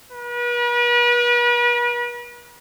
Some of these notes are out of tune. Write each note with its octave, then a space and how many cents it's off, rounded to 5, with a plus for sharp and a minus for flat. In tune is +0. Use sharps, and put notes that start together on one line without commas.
B4 -40